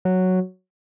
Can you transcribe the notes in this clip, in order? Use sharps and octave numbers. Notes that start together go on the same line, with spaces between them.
F#3